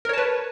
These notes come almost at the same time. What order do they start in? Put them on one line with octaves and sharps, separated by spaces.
A#4 C#5 A5 B4